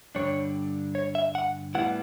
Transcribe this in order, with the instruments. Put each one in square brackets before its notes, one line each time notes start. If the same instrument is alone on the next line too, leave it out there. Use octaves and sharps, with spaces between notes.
[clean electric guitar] G2 D3 G3 D4 C#5
C#5
E5
F#5
A2 G3 B3 E4 F#5